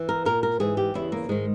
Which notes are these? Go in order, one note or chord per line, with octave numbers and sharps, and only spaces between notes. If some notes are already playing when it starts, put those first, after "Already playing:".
Already playing: E3
A#4
A#2 A#4
A#4
G#2 E3 G#4
G4
E2 C#3 E3 E4
A#3
G#2 D#3 G#3